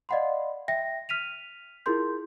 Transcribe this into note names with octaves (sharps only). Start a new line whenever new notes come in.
D5 D#5 F5 F#5 B5 C6
E5 G5 A#6
F6 B6 D#7 F7
E4 F4 G#4 A#4 C6 G6